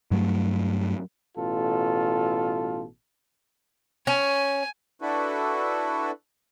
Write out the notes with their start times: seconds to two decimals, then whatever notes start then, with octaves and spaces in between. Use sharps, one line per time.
0.11 G2 F#3 A3
1.36 A1 B2 F4 A4
4.07 C#4 G#5
5.02 D4 E4 F#4 A4 B4